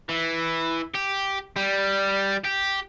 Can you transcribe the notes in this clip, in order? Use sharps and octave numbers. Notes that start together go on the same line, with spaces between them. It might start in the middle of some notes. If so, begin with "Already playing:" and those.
E3
G4
G3
G4